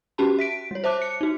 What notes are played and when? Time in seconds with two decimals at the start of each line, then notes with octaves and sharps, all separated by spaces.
0.18 C#4 F#4 G4 A5 B5
0.39 E5 B6 D7
0.71 G3 C#5
0.84 C5 E5 A5 D6 F#6
1.02 C#7
1.21 D#4 F#4